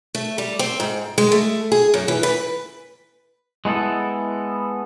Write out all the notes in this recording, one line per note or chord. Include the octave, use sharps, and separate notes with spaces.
A3
G3
C4
G#2
G#3
A3
G#4
F#2
E3
B4
G#3 B3 E4 A4